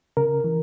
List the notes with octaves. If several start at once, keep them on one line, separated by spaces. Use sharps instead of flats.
C#3 A#4
E3